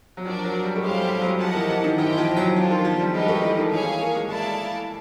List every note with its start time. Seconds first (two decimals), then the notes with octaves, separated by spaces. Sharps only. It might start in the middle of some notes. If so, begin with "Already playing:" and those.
0.17 F#3
0.25 F3 D4 F#4 A#4 D5
0.44 F#3
0.64 G3
0.75 A3
0.83 G#3 C#4 E4 G4 C5 F5
1.02 G3
1.21 F#3
1.40 F3 G4 A#4 D#5 F#5 A5
1.55 E3
1.69 E3
1.84 D#3
1.98 E3 E4 G4 C5 D#5 G5
2.18 F3
2.36 F#3
2.56 F3 D4 F4 A4
2.71 D#3
2.85 F3
3.00 G3
3.14 G#3 B3 D#4 G4 B4 D#5
3.28 A3
3.43 E3
3.57 D#3
3.71 E3 G#4 C#5 F5 G#5
4.00 A#3
4.15 G#3
4.29 G#3 E4 A4 D5 F5 A5